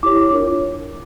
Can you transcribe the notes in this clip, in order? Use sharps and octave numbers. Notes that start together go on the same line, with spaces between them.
E4 G4 C#5 D6
D6
D4 F4 A#4 C#5